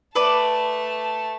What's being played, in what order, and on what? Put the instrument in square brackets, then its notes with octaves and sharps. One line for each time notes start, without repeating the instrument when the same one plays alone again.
[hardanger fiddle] A3 A5 [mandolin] B4 D5